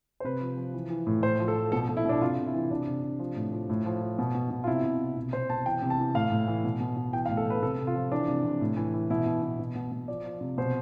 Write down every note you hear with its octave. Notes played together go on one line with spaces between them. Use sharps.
C5
C3 B4
F3
F3
E3
E3
A2
A2 C5
F3
A4
F3
B2 A4
B2
E4
B2 D4
C3 F4
C3
E4
E3
C3 D4
C3
C3
F3
A2
F3
A2
F3
F3
B2
B2
B2
F4
C3 E4
C3
C3
B2
B2 C5
B2 A5
E3 G5
C3
A5
E3
A2 F5
A2
E3
B2
B2
B2
E3 G5
F5
A2
A4
A2 B4
C3 A4
C3
F4
F3
E3 D4
C3
C3
A2
E3
E3
B2 E4
B2
B2
B2
B2
B2
F3 D5
F3
C3
B2 C5